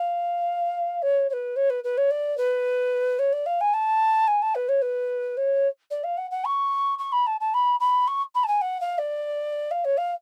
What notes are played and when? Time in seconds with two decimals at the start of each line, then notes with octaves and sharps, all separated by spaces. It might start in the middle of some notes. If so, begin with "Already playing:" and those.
Already playing: F5
1.02 C#5
1.29 C#5
1.33 B4
1.56 C#5
1.69 B4
1.84 B4
1.97 C#5
2.10 D5
2.37 B4
3.19 C#5
3.32 D5
3.46 F5
3.60 G#5
3.73 A5
4.27 G#5
4.42 A5
4.55 B4
4.68 C#5
4.81 B4
5.37 C#5
5.90 D5
6.03 F5
6.17 F#5
6.30 F#5
6.44 C#6
6.98 C#6
7.12 B5
7.26 A5
7.40 A5
7.54 B5
7.80 B5
8.07 C#6
8.34 B5
8.43 A5
8.47 G#5
8.61 F#5
8.80 F5
8.98 D5
9.71 F5
9.84 C#5
9.97 F5